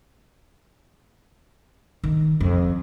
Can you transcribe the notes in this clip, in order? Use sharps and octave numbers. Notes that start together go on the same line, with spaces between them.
D#3
F2